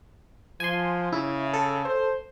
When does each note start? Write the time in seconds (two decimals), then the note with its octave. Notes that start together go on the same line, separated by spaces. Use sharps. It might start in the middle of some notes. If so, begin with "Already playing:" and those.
0.60 F3 G#5 C6
1.12 C#3 E4
1.54 A4
1.85 C5